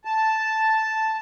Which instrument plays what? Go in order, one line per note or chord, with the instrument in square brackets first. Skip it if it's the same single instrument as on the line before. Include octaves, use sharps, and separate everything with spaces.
[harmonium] A5